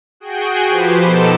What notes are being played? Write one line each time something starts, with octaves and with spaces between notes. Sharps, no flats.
F#4 G#4 G5
F3 G4 B4 C5
B2 D#4 A4 D6 E7